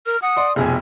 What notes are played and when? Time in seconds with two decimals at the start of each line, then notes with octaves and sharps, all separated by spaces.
0.06 A#4 F6
0.22 F#5 D#6
0.37 D5 C6
0.56 F1 B1 F2 G#4 G#5